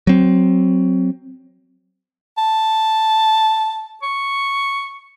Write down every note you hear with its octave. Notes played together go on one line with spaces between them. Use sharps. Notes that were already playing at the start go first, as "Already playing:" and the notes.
F#3 C4
A5
C#6